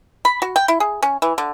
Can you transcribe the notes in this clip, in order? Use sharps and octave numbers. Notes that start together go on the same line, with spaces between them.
B5
F#4
G5
E4
G#4
C#4
E3
D3